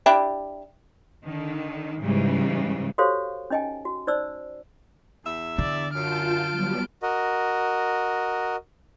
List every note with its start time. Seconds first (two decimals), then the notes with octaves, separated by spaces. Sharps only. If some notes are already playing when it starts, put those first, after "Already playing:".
0.06 D4 E4 G4
1.24 D3 D#3
2.02 G#2 C#3 E3 G3
2.98 F#4 G4 A4 C5 C#5 F5
3.50 C#4 D#4 D#5 G5 G#5
3.85 F#4
4.07 D#4 C5 D5 E6
5.25 E2 E5
5.58 D3 D5
5.94 F#2 F4 A5 F6 G6 D7
6.51 F#3 G3 B3
7.03 F#4 A#4 D#5